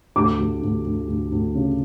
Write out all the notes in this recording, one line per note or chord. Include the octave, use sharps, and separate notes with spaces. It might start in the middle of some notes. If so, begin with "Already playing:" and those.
D2 D6
D2
D2
D2
D2
D2
C#3